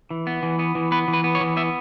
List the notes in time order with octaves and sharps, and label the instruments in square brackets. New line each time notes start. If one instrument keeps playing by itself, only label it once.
[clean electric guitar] E3
B3
E3
B3
E3
B3 B4
E3
B4
B3
C#5
E3
B3 E5